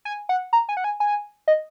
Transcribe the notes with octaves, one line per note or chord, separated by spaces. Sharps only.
G#5
F#5
A#5
G#5
F#5
G#5
G#5
D#5